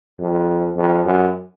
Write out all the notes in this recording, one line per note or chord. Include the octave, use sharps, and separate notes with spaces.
F2
F2
F#2